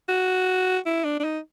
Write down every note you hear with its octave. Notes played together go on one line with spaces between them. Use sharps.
F#4
E4
D4
D4
D#4